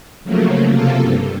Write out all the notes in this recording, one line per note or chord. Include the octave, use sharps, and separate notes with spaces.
C#3 F3 F#3 A3 A#3
C3 A#3 F4 A4
G2